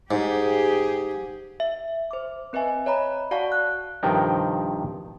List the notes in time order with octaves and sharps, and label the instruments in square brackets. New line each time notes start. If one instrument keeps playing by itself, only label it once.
[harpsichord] G#2 [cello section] G4 G#4
[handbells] E5
C5 D6
C4 B4 D#5 E5 G#5
C#5 D#5 A#5 B5
F#4 D5 F5 F#5 A5 C#6
F#6
[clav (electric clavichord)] G2 C3 D#3 F3 G5 A#5